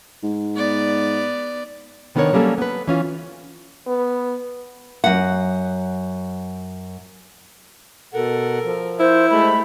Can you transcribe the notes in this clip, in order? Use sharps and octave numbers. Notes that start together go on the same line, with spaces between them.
G#2
B3 D5
C3 D#3 B3 D4 A#4 C#5
F#3 G3 A#3 C#4 A4
B3 B4
E3 C#4 F4
B3
F#2 F#5
B2 A4 A#4 F#5
F3
E4 C5
G#3 A3 G4 B5